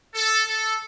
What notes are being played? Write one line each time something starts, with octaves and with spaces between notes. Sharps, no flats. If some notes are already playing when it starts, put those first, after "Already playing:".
A4
A4